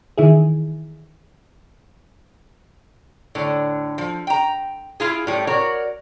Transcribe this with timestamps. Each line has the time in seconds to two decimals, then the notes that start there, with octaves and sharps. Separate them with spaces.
0.18 D#3 E3 E4 G#4
3.35 A2 D3
3.98 F3
4.27 G5 A#5
5.00 E4 F4 G#4
5.27 A2 G3
5.47 F#4 A#4 C#5 D5